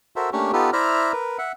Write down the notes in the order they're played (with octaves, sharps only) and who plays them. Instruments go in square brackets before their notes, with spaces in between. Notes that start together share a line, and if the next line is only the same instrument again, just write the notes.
[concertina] F#4 A4 A#4 C5 E5
A3 A#3 C#4 D4 G4 C#5
B3 D#4 F4 G4 A4 B4
E4 C5 D5 E5 A#5 F6
A#4 B4
E5 F#5